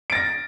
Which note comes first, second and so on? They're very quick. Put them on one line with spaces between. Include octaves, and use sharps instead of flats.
D7 A6 A#6